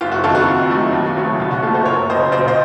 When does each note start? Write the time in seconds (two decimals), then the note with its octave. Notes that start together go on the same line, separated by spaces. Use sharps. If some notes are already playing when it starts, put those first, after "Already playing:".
0.01 F#1 F4
0.12 F#4
0.24 F2 D#3 F4 A4
0.35 F#4
0.47 F2
0.70 D#3 F#3 A3
0.93 D#2
1.16 C#3 F#3 A3
1.40 C2 F4
1.51 F#4
1.62 A#2 A3 F4 A4
1.74 A4 C5
1.85 F#1 A#4 C#5
2.10 F#2 C#3 C5 D#5
2.32 A#1 C5 D#5
2.48 C5 D#5